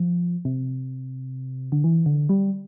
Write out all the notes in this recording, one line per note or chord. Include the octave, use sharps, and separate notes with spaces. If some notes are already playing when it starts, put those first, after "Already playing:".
Already playing: F3
C3
D3
E3
D3
G3